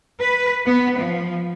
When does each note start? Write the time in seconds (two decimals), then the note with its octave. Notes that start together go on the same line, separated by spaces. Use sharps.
0.19 B4
0.65 B3
0.96 F3